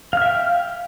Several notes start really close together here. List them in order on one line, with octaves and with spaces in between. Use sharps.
F5 F6 E5 G5